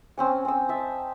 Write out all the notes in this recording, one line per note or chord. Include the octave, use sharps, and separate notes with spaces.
C4 C#4 G#5
C4 E6
D#5 E5 A5